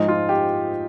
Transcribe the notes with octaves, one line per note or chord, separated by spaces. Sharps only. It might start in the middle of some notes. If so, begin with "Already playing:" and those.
Already playing: G#2 F3 G#3 D#4
F4
G4